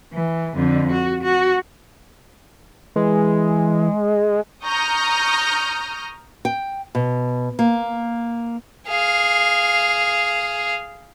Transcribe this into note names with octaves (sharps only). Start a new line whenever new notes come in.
E3
F2 D3
F#4
F#4
E3 G#3
A#5 C#6 D#6 F6 G6 A#6
G5
B2
A#3
G#4 F5